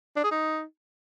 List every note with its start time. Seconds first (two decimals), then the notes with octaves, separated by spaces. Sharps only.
0.16 D4
0.24 G#4
0.31 D#4